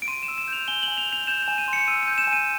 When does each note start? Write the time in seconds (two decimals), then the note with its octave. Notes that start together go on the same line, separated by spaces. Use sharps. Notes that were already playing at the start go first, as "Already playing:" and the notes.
0.02 D7
0.08 C6 D#7
0.23 E7
0.28 E6
0.38 E7
0.48 G6 F7
0.68 G#5 G7
0.83 F#7
0.88 G#5
0.98 F7
1.08 G6
1.13 F7
1.27 G6 E7
1.43 E7
1.48 G#5
1.58 D#7
1.68 C6
1.73 C#7
1.88 E6 D#7
2.03 D#7
2.08 G6
2.18 E7
2.27 G#5
2.33 D#7